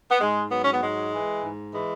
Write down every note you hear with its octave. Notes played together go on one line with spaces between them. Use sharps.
B3
G#2 G#3
F#3 B3
C#4
B3
G#2 G#3
E3
G#2
E3 G#3